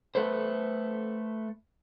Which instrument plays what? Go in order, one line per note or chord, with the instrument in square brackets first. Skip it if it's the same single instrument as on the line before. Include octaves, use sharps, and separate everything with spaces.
[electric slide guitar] A3 A4 B4 C5